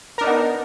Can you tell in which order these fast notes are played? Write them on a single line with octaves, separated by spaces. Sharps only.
A#4 D4 D#4 B3